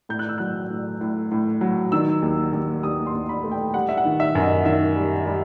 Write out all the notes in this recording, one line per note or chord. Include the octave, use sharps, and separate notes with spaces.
A2 G6
F#6
E6
F#3 F#6
A2
A2
A2
F#3
D#3 E6
D#2
D#2
D#2 D#6
C6
D#2
B5
A3
G5
G3 F#5
E5
F#5
D#3
E5
F#2
D#5
D#3 E5
G3
G3